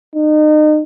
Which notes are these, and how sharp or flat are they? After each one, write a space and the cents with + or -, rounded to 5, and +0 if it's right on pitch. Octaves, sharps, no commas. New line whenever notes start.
D#4 -30